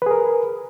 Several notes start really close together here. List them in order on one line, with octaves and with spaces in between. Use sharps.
B4 G#4 A#4